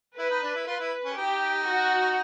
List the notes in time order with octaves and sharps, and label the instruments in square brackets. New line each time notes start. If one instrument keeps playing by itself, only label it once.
[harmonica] E4 [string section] B4
[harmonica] D#4
D4
E4
[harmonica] F4 [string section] B4
[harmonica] E4
C#4
[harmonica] D#4 [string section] G4
[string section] F#4